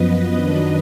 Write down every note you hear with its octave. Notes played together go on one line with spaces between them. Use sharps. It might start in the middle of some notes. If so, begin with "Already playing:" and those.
Already playing: F#2 F3 B3 B4 D#5
F#2 D#3 F#3 D4